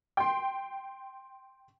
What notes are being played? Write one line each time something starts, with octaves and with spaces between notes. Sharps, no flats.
G5 C6